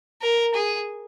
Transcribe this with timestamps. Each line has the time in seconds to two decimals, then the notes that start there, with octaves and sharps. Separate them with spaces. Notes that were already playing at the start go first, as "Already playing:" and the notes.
0.22 A#4
0.54 G#4